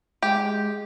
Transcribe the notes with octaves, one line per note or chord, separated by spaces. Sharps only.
G#3 G4